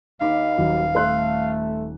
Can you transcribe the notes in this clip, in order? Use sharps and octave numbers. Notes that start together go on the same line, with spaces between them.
D#2 D#4 F5 B5 D6
D#1 F#3
A3 A4 C6 F#6